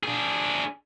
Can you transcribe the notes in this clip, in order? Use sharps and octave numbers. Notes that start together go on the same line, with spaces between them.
D4 G#4